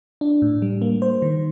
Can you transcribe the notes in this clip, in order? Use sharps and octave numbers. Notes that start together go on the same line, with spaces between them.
D4
A2
G3
A#3
C5
D#3